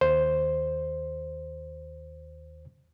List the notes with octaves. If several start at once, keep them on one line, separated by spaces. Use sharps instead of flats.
D#2 C5